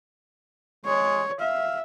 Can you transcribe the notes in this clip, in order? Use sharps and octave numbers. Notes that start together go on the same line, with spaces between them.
G#3 C#5
E5 F5